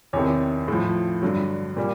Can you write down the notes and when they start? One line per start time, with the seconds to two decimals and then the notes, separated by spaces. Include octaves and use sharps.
0.13 E2 C3 D#3 C#5
0.68 A2 F3
1.22 G2 D3 F#3
1.77 A#2 G3